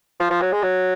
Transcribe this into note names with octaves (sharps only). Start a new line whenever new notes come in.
F3
F3
F#3
G#3
F#3